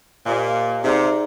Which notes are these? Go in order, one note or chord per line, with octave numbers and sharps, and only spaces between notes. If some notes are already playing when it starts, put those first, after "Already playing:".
A#2 G4 C5 D#5 G#5 D6
C3 D#4 G#4 D5 F5 A#5